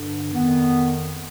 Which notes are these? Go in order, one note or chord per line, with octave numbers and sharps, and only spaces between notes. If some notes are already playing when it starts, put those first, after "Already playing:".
Already playing: G2 D3
F2 D#3 B3